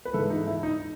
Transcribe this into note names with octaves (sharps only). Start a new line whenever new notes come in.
B4
G#2 E3 G#3 A4
D#4
E4
D#4